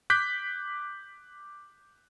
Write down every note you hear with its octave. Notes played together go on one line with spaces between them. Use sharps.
D6 F#6 G6 B6